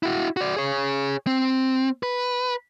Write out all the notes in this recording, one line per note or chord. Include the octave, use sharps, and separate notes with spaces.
E4 F#4
F#4 D5
G#4 C#5
C4
B4